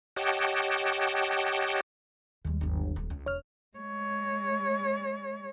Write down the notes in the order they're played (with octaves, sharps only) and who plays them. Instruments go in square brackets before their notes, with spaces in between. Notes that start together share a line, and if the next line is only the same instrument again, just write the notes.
[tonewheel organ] G4 C#5 D#5 F#5 G5 A5
[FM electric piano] D#2 [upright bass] G3 G#3
[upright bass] D1 G1
D#1 F2
C#2
[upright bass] E1 [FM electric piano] C#5 F6
[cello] G#3 C#5